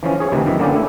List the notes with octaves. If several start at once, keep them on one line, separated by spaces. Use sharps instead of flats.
E3 F3 C#4
G#4 C#5
D2 C3 D#3 E3
F#2 D#3 E3
D3 A#3 B3 C#4 D5 G5
A3 E4